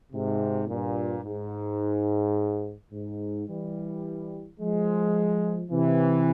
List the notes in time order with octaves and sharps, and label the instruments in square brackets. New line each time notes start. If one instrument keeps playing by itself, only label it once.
[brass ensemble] G#2 C3
G2 A#2
G#2
G#2
E3 G3
F3 G#3
C3 E3